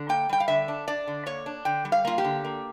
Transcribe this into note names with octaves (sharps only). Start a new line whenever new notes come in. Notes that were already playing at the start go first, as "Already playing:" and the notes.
Already playing: D3
A#3 G5
G3 G5
F5
D3 E5
D4
D4 D5
D3
A#3 C#5
D4
D3 G5
G3
F5
A#3 F4
G4
D3
A#3